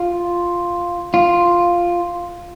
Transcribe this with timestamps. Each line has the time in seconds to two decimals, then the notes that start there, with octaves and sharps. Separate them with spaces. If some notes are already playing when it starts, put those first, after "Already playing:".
Already playing: F4
1.14 F4